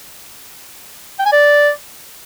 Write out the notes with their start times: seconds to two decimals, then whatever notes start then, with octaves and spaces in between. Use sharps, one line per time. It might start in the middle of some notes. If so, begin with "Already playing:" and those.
1.19 G5
1.26 G#5
1.33 D5